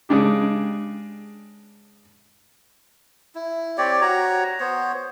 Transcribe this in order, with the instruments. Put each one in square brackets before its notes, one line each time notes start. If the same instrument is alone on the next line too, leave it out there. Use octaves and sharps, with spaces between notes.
[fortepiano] C#3 G#3 D4 G4
[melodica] E4
C4 G4 C#5 D5
F#4 C#5 A#5
B3 C5 C#5